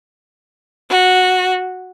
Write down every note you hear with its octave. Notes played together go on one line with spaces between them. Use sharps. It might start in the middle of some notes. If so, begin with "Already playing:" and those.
F#4